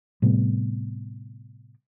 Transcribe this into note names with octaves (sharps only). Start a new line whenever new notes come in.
A2 C3 G3 B3